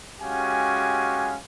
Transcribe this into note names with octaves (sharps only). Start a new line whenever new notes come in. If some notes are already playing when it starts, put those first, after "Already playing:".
G#3 C#4 F#4 G4 F5 G#5